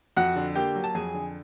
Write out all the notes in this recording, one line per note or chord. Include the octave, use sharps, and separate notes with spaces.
F2 F#4 F#5
D3
A#3 G4 G5
F#3
A5
F2 G#4 G#5
D3